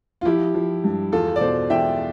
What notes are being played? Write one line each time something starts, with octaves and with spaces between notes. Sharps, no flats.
F4
F3 E4 G4
F3
G2
E2 F4 A4
D5
B2 A4 C5
E2 E5 G5